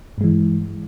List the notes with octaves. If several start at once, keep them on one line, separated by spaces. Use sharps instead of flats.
G2 E3 G#3